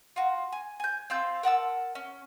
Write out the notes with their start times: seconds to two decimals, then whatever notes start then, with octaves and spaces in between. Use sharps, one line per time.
0.16 F4 F#4
0.52 G#5
0.80 G#5 G6
1.10 C4 F4 E6 G6
1.43 A#4 F#5 A5 E6
1.95 C#4